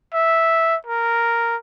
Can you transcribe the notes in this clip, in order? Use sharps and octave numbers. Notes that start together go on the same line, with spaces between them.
E5
A#4